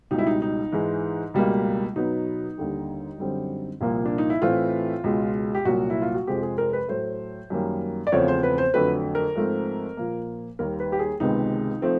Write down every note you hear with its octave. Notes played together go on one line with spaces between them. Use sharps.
C#2 B2 G3 D#4
E4
D#4
D#4
G#2 E3 G#3
C#2 B2 G3 A#3
B2 F#3 B3 D#4
D#2 D3 G3
F#2 D3 G3 C4
C2 A#2 F3 A#3
D4
D#4
E4
A2 E3 A3 C4 F4
C#2 B2 G#3
G4
C2 A#2 F#3 A#3 F#4
E4
F4
F#4
F2 C3 F3 G#3 C4 G4
G#4
A#4
B4
A2 F#3 A3 C5
F#2 D#3 G3 A#3
D5
E2 C#3 F3 A3 C4 C#5
C5
B4
C5
F2 D3 F#3 A3 B4
A#4
G#2 F3 A3 C4
A#2 F3 A#3
D#2 D#3 G3 A#3 A#4
B4
G4
G#4
C#2 C3 D#3 G#3 B3 D#4
F3 A3 C4